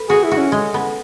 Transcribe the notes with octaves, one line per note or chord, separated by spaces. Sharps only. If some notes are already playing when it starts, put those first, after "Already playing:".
Already playing: B4
F#4 G#4
E4
F#4
C#4
G#3
B3